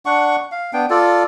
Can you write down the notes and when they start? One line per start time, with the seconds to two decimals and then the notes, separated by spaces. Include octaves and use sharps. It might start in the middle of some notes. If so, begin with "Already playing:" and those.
0.06 D4 F#5 C#6
0.52 F5
0.73 B3 D4 G5
0.90 F4 A4 D5